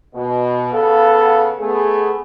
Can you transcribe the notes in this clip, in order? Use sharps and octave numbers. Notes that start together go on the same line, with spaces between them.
B2
C#3 B3 A4 F5 F#5
A3 B3 G#4